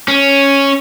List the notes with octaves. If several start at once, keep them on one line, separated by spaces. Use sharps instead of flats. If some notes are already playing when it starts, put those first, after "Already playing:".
C#4